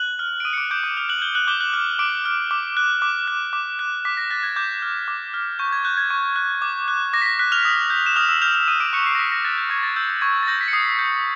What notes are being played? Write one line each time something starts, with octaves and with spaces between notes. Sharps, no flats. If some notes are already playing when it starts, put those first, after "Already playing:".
Already playing: F#6 F#7
F6
D7
D#6 D#7
C#7
D6 D7
D6 G6 D7
D#6 D#7
D#6 F6 F7
F#6 F#7
G6 G7
F#6 F#7
D6 G6 G7
F#6 F#7
F6
D6 D7
F6
D6
F#6
D6
F#6
D6
F#6
D6 B6
A#6
F#6 A6
G#6
D6 G6
F6
D6
F6
C#6 G6
G#6
F#6 G6
G#6
C#6
F#6
D6
F#6
D6 A#6
B6
A#6
F#6 B6
F6 F7
D#6
G6
E7
D#6 F6 F7
E6 E7
F6 G6 F7
F6 F7
D#6 D#7
D6 D7
C#6 F#6 C#7
C7
A#6
D#6 B6
A#6
F#6 A6
G6
C#6 G#6
A#6
A6
E6 G6 A6
G6
C#6 G#6
A6
E6 G6 A#6
B6
C#7
D#6 C7
G6